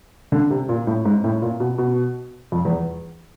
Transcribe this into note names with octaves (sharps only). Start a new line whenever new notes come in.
D3
C3
A#2
A2
G#2
A2
A#2
B2
B2
F2
E2